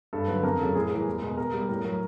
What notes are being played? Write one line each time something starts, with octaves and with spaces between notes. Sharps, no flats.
G2 A4
D3 F#3 B4
F2 A#4
C#3 F#3 A4
A2 G#4
E3 G3 A#4
E2
B2 G#3
B2 A#4
G3
A2 A#4
F#3 A#4